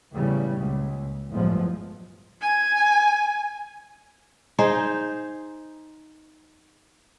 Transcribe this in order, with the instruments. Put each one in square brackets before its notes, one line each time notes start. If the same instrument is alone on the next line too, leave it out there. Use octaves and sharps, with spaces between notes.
[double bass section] E2 A2 C#3 G3
C#2 A#2
G1 E2 A2 F3 F#3 G#3
[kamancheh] G#5
[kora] D#4 G#4 C5